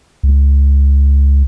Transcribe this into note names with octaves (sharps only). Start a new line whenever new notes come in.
C#2